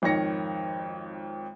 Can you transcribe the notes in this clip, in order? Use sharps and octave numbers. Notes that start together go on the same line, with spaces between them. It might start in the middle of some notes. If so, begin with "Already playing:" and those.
G#1 F2 D#3 C#5 A#6 C#7